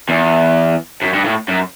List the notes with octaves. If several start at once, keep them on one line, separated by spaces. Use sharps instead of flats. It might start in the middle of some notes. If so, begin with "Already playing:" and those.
E2
F#2
G2
A2
F#2